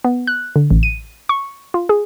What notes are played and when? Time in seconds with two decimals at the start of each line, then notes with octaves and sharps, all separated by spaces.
0.04 B3
0.27 F#6
0.56 D3
0.70 A1
0.83 D#7
1.29 C#6
1.74 F4
1.89 G#4